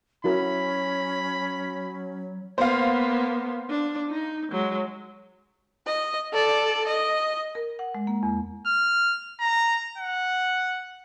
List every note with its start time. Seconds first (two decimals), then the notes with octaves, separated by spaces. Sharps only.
0.24 F#3 C#4 E4 F#4 A#4 B5
2.58 A#3 B3 C5 F5
3.70 D4
4.10 D#4
4.51 F#3 G#3
5.86 D#5
6.33 A4 D5
6.87 D#5
7.55 A#4
7.79 F#5
7.95 G#3
8.07 A#3
8.23 E2
8.66 F6
9.41 A#5
9.98 F#5